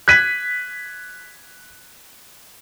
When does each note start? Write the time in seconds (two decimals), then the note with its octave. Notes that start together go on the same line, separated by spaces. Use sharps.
0.08 F#6 G#6 B6 D#7